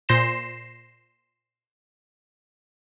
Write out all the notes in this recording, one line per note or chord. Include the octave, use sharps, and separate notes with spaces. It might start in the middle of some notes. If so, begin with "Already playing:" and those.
A#2 C5 C6 A#6 C7 E7